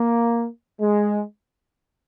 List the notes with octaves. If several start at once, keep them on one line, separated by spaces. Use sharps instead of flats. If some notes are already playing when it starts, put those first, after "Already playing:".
Already playing: A#3
G#3